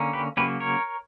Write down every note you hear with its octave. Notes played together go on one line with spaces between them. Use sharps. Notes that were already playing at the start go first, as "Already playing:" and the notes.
Already playing: D3 A#3 C#4
G4 B4
C#3 F#3 A#3 C#4 G4 B4
A#4 C#5